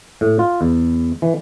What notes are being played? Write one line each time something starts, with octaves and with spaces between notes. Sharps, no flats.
A2
F4
E2
E3